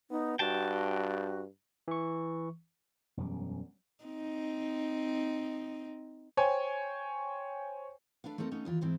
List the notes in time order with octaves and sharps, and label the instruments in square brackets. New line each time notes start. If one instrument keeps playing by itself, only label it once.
[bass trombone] B3 [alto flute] D#4
[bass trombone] G2 [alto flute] F#4 [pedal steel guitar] G5 A5
[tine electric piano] E3 C#6
[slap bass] E1 F#2 G3
[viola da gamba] C4 D#4
[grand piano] C5 C#5 G5 G#5
[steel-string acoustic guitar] A3 D4 B4 F5
A3 C4 D#4 A4 A#4
A3 B3 C#4 D#4
D#2 E3 F4
G#2 E3 C4 E4